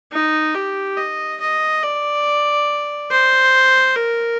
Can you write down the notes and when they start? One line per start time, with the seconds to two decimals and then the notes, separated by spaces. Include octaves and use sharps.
0.13 D#4
0.55 G4
0.97 D#5
1.40 D#5
1.83 D5
3.11 C5
3.96 A#4